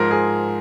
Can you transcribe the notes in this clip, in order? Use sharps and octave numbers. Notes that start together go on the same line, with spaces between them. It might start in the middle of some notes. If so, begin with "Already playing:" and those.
Already playing: G#2 F3 A#4
G#4